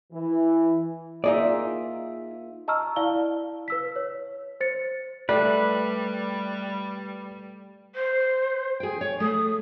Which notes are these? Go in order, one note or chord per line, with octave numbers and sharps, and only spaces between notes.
E3
A#3 D#4 F4 G#4 D5 E5
D#5 A5 A#5 C#6 E6 F6
E4 D5 F5 A5 G7
B4 E6 B6
C#5
C5 A6 C#7
G3 A3 B4 D5
C5
G#4 G5
C#5
A3 D#6